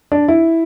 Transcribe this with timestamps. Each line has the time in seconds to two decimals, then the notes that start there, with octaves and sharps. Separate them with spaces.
0.12 D4
0.28 E4